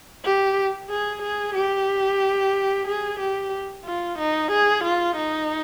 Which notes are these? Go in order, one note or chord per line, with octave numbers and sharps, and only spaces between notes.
G4
G#4
G#4
G4
G#4
G4
F4
D#4
G#4
F4
D#4